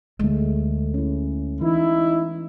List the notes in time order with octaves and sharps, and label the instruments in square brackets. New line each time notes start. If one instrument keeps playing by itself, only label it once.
[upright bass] D2 [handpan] G#3 A3
[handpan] C#4 E4
[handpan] E3 [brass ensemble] D#4 E4